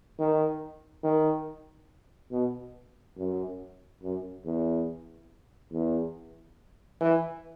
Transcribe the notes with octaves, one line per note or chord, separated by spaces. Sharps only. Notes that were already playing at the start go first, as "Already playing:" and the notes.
D#3
D#3
B2
F#2
F#2
E2
E2
E3